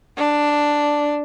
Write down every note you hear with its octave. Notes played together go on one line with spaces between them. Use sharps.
D4